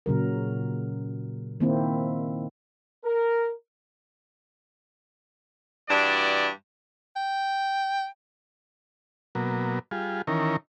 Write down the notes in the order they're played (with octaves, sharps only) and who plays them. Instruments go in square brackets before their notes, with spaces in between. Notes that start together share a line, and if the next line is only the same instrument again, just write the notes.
[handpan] A#2 C#3 F#3 A#4
D#3 A#3 C4 E4
[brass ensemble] A#4
[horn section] G2 E3 D4 F#4 D5
[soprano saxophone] G5
[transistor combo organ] B2 F#3 A#3
G3 F4 G#4
D#3 E3 C#4 A#4